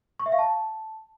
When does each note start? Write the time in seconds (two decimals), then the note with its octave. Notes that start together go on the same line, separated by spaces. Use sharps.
0.20 C#6
0.26 E5
0.32 F5
0.39 A5